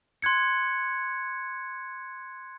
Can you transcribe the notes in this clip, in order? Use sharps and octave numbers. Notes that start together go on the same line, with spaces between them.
C6 F#6 G#6 C#7